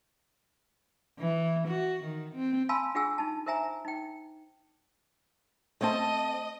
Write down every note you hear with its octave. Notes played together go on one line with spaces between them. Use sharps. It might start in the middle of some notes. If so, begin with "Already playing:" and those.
E3
F#4
D#3
C4
F5 G#5 A5 B5 C6 E6
D4 F4 G#4 F#5 G#5 E6
D#4 A5
A#4 C5 E5 G#5 A#5
D#4 G5
A3 C4 D#5 A5